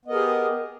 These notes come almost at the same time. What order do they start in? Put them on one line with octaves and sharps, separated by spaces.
B3 D#5 A#4 G#4 G4